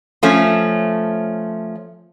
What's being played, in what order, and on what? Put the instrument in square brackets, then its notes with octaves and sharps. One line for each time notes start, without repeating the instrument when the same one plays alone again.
[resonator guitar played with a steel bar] F3 A3 C#4